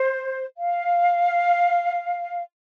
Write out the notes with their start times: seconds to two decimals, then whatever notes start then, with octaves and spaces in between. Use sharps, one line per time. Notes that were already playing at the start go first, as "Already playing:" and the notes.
Already playing: C5
0.58 F5